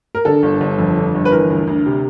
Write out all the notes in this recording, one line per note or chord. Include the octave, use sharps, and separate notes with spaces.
A#4
D3 A4
G1
G1
F2
D3
G1
B4
E3 A#4
D2
D2
C3